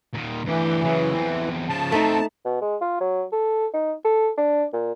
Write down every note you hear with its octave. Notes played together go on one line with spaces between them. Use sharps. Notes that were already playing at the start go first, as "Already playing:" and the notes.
A#2 D#3
D2 E3 G4
C#3 F#3
E2 C4
C#3 F3 A5
A3 C4 D#4 A4
B2
G#3
F4
F#3
A4
D#4
A4
D4
A#2